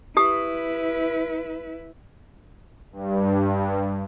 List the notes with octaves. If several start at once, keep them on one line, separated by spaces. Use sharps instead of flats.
E4 G4 B4 D#6
G2